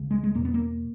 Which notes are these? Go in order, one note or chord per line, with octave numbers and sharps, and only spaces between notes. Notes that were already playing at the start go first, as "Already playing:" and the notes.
Already playing: C#2 C#3
G#3
G#3
E2 B2 A#3
B3
A#3